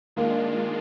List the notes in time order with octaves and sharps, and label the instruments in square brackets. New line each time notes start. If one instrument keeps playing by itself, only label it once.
[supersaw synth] D#3 G#3 D4 F4 [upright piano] A#3